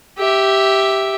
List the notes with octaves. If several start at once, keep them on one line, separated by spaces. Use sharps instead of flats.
G4 E5